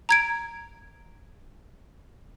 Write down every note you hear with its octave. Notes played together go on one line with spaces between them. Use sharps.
A#5 G#6 D7